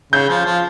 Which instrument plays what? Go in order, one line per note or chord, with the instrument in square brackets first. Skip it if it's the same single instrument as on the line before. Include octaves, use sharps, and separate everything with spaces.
[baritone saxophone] C#3 [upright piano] G6
[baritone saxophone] F3
F3